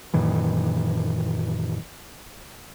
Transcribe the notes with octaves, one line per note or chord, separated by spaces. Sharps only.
F#2 A#2 D#3 E3